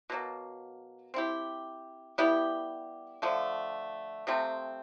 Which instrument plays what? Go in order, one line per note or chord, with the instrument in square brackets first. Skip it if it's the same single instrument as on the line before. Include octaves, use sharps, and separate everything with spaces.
[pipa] B2 F#3 A#3
C4 E4 G4
G3 B3 E4 G4
D3 F3 A3
C3 F3 A3 C4